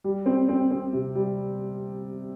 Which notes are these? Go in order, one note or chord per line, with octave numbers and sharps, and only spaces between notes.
G3
C4
C4
C4
C3
G3